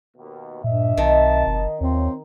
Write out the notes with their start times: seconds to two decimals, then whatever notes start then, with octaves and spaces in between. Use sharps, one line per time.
0.17 D#2 B2
0.64 G2 A#2 D#5 E5
0.97 B1 B2 D#3 C4 A5
1.47 F#1 D#5
1.81 D#2 C3 C4 F4 C#5